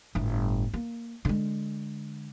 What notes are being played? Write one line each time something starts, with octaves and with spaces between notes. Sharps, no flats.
G1 A2
A#3
D3 G#3